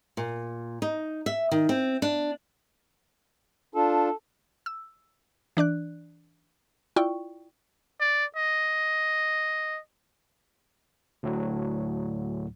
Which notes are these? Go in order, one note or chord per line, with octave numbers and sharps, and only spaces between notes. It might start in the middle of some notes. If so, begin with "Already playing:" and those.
A#2
D#4
E5
D#3
C4
D4
D4 F4 A4
E6
E3 D4 D5 F#6
E4 F4 D5 G5 C#6
D5
D#5
D2 A2 F#3